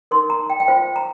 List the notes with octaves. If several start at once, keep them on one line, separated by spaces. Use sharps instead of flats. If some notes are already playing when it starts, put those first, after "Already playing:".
D#4 A#4 C6
A#5
G5
G5
F4 C5 F5
A#5